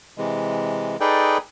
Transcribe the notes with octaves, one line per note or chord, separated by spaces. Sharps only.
C3 E3 G#3
D#4 G#4 A4 B4 D5 G5